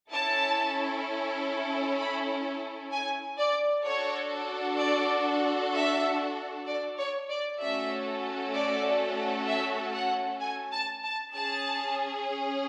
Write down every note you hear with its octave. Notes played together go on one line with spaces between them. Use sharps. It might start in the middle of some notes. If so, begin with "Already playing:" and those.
C#4 E4 A4 A5
B5
G#5
D5
D4 F#4 A4 C#5
D5
E5
D5
C#5
D5
A3 C#4 F#4 A4 E5
D5
E5
F#5
G#5
A5
A5
C#4 G#4 A5